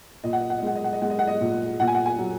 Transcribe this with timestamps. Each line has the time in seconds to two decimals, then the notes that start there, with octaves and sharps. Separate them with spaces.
0.24 A#2 D#5
0.33 F#5
0.41 D#5
0.50 F#5
0.58 D#5
0.63 G#3 F#5
0.76 D#5
0.84 F#5
0.93 D#5
1.02 G#3 F#5
1.10 D#5
1.19 F#5
1.27 D#5
1.41 A#2
1.80 A#2 F#5
1.87 G#5
1.95 F#5
2.06 G#5
2.18 F#3